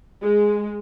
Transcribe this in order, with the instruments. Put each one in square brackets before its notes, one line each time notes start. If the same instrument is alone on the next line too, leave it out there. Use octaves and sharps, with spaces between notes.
[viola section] G#3